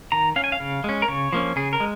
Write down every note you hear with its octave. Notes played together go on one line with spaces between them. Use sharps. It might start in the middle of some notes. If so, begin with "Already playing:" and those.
D#3 A#5
C#4 F5
G#5
F5
C#3
G#3 C#4
A#4
C#3 C#5
F3 A#3 C#4
C#3 G#4
A#4
G#3